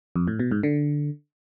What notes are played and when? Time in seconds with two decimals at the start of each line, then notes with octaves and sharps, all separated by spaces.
0.16 F2
0.28 A2
0.39 B2
0.51 G#2
0.63 D3